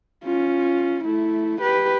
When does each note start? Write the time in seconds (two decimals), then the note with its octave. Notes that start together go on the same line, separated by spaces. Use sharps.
0.24 C#4 F4
1.04 A3 E4
1.62 G4 B4